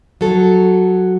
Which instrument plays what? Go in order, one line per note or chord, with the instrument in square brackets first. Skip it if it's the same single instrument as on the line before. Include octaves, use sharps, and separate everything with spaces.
[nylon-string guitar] F#3 A4